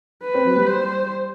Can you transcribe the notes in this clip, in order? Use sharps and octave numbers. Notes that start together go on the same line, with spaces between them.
B4
C4
F#3
G3
C5